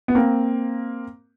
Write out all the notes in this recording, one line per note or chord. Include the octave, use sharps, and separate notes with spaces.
B3
A#3 C4